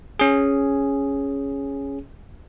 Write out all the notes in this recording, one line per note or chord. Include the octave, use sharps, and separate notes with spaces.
C#4 G#4